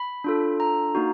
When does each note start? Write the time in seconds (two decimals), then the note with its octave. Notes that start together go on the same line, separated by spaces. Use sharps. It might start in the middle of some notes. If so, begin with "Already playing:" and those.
Already playing: B5
0.24 D4 F4 A4
0.60 A#5
0.95 A#3 D#4 F#4